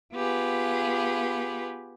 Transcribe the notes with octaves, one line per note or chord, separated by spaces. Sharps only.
B3 F4 G4 G#4 B4